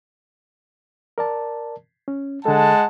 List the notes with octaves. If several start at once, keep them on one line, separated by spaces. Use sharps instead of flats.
A#4 D5 A5
C#4
D3 G#3 A4 F#5 A5